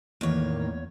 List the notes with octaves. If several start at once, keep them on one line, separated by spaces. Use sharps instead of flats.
E2 A2 D#3 A#3 C#5